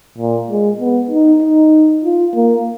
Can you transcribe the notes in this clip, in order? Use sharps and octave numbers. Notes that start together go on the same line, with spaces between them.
A#2
G#3
B3
D#4
D#4
F4
A#3